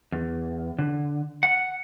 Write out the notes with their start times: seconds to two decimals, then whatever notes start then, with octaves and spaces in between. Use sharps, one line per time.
0.12 E2
0.79 D3
1.43 F#5